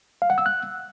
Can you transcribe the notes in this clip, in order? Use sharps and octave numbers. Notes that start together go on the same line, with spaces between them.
F5
F#5
E6
F#6